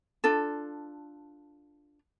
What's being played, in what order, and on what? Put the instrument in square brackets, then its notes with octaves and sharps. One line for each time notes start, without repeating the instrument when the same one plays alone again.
[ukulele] D4 F4 A4